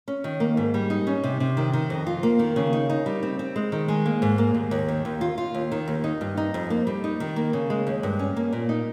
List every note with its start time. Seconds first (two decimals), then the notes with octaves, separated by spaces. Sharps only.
0.08 C#4
0.24 D#3
0.40 A#3
0.57 G#2
0.74 G3
0.90 D#4
1.07 C#4
1.24 C3
1.40 C3
1.57 D#3
1.73 D#3
1.90 F2
2.07 F4
2.23 A#3
2.39 D#3
2.56 C#3
2.73 D#4
2.90 D#4
3.06 G3
3.23 C4
3.39 C4
3.56 G#3
3.72 D#3
3.88 G#3
4.06 A#3
4.22 G#2
4.38 A#3
4.54 D#2
4.71 D#2
4.88 D#3
5.05 D#2
5.21 F4
5.38 F4
5.55 D#2
5.72 D#3
5.88 D#2
6.04 D#4
6.21 G2
6.37 D#4
6.54 F2
6.70 A#3
6.87 G3
7.04 D#4
7.20 D#3
7.36 A#3
7.53 C#3
7.70 G#3
7.87 D#2
8.03 G2
8.19 C#4
8.36 A#3
8.53 A#2
8.69 D#4